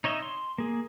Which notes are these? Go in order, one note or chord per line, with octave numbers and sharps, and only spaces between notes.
D#4 C#5 D#5 E5
C6
A#3 G#4